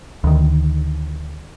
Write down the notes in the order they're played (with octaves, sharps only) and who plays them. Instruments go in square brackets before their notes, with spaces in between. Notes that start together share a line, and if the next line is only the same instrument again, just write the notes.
[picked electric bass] D2 D#3